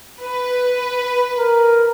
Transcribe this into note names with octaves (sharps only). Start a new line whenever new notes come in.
B4
A#4